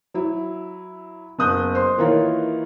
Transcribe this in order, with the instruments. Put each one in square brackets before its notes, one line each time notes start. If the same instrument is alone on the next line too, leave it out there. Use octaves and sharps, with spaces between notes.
[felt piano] F#3 E4
F#1 B3 D#6 F#6 G6
C5 C6
D#3 E3 A#3 F4 A#4 C#5